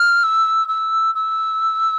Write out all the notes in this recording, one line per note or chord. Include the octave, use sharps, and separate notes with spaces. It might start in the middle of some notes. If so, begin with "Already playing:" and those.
Already playing: F6
E6
E6
E6